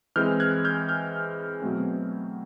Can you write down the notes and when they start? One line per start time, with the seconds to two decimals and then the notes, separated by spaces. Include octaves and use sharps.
0.16 E3 G#3 C4 F6 G6
0.40 F#6 G#6
0.65 F6 G6
0.89 F6 G6
1.62 B2 F#3 A3 C4